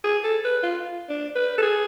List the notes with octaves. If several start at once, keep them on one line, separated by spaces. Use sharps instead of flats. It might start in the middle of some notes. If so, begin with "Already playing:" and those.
G#4
A4
B4
F4
D4
B4
A4
G#4